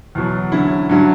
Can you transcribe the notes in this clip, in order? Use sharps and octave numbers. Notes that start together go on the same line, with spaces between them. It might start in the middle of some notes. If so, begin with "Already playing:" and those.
E2 B2 F#3
D3 F#3 C#4 E4
G2 D3 F#3 C#4 E4